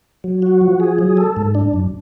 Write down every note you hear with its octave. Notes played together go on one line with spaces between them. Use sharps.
F#3
F#4
F3
G#4
F#3
A4
G#2
D4
F#2